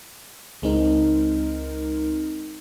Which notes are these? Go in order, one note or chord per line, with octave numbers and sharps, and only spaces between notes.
C#2 G#3 C4 D#4 A#4